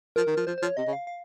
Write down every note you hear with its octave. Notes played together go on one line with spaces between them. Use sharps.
F3 A#4
D#3
F3
F3 C5
C5
F3 C#5
C3 D#5
C#3
F5
F5